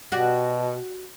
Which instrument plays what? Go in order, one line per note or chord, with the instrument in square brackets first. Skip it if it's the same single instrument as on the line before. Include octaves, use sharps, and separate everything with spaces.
[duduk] B2 [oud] F#4 G4 D5